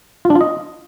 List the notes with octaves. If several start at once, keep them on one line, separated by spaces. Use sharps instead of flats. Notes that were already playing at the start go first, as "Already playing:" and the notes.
F4
D4
F4
D#5